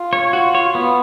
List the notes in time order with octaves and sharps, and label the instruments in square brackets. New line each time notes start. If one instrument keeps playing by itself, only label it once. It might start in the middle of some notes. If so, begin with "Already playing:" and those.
Already playing: [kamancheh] F4
[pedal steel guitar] C#5
F#4
C#5
B3